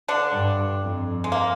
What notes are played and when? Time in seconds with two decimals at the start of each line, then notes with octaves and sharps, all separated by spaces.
0.08 D3 D4
0.33 G2
0.83 F2
1.24 G#3
1.32 A#3